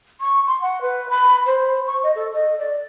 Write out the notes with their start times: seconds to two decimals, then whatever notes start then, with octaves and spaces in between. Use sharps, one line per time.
0.21 C#6
0.47 C6
0.61 F#5
0.82 B4
1.10 B5
1.46 C5
1.87 C#6
2.03 D#5
2.16 A4
2.34 D#5
2.58 D5